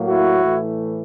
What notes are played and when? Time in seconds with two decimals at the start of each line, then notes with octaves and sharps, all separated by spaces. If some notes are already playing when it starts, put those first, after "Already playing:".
Already playing: A2 F#3 A#3
0.08 E4 F#4
0.43 A2 E3 A3